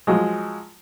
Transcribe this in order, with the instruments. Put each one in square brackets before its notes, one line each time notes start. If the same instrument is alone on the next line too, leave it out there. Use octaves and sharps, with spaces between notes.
[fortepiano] F3 F#3 G#3